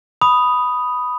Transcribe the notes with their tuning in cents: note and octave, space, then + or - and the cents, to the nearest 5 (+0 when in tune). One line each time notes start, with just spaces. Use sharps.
B5 +0 D#6 +0